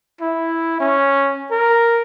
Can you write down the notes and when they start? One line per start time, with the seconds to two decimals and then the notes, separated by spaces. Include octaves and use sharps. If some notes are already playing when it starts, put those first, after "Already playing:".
0.21 E4
0.80 C#4
1.51 A#4